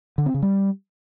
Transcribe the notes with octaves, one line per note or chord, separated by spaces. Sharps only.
D3
C4
C#3
G3